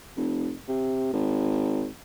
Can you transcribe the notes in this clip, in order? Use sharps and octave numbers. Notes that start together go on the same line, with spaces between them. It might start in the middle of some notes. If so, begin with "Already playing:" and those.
F1
C3
G#1